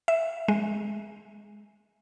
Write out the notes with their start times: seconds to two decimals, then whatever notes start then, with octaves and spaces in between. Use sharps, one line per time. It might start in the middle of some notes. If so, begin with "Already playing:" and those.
0.08 E5
0.48 G#3